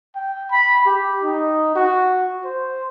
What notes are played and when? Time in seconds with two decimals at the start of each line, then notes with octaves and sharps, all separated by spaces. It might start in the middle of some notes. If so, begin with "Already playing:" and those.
0.16 G5
0.51 B5
0.86 G4
1.23 D#4
1.75 F#4
2.45 C5